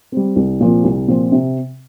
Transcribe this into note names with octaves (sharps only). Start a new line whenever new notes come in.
G3 C4
C2
A#2 F3 C4
C2
A#2 F3 C4
C3